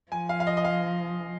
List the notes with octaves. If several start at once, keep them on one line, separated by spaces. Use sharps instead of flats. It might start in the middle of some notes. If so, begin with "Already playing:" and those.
F3 G#5
F5
F5
D#5
D#5
F5